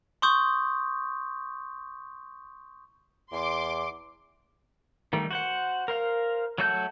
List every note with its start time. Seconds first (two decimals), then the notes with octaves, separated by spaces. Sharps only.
0.22 C6 C#6 D#6 G6
3.32 E2 C6 D6
5.13 D#3 G3 A3
5.31 F#4 C5 F#5
5.88 A#4 C5 F5
6.58 F#3 A3 F#4 A4 G6